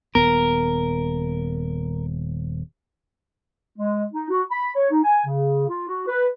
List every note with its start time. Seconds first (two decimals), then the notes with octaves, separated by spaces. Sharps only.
0.15 D#1 B3 A#4
3.78 G#3
4.13 D#4
4.30 F#4
4.51 B5
4.76 C#5
4.90 D#4
5.03 G#5
5.25 C#3
5.67 F4
5.87 F#4
6.07 B4